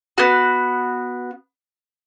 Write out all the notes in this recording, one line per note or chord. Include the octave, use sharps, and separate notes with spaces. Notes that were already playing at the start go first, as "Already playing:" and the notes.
B3 F#4